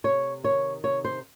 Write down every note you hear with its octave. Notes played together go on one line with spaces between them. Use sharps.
C3 C#5
D#3 C#5
C3 C#5
C5